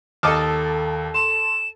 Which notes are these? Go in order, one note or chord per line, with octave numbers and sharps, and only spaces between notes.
D#2 A4 D#5 A5 D6 F6
C6 E7